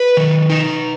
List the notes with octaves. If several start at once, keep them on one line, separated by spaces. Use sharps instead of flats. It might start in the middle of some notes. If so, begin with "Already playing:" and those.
Already playing: B4
D#3
D#4